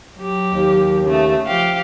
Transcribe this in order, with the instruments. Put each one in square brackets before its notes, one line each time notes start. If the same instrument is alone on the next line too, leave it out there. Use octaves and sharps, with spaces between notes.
[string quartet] F#3 G4
[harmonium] D#2
[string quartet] C#3 A3
F3 G4 F5